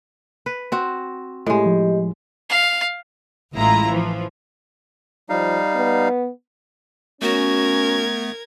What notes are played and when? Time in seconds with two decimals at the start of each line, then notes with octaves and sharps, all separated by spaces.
0.46 B4
0.72 C4 F#4
1.46 A2 G#3 G4 D#5
1.66 F3
2.49 F5
3.53 A1 A2 G#3 E4 F4 A#5
3.88 E3 F3
5.29 F3 G3 D#4 F5
5.75 B3
7.22 A3 B3 C#4 F#4 A#4 G#6